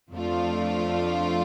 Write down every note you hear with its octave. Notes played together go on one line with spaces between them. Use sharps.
F2 F3 A3 D4 F4